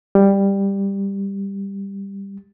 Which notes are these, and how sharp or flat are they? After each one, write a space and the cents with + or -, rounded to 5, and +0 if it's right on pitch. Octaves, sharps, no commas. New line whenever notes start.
G3 +10